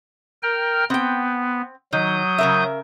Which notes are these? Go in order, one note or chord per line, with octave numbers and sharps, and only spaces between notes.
A#4 G5 F6
B3 C4 G5
D#3 F#3 D#6 G6
C#3 A#4 E5